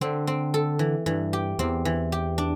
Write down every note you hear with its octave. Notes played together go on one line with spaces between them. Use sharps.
D3 C4
C4
A4
E3
G2 E3
G4
E2 C4
E3
G4
D4